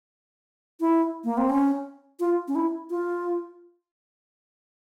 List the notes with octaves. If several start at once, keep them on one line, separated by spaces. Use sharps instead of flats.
E4
A#3
C4
C#4
F4
C#4
E4
F4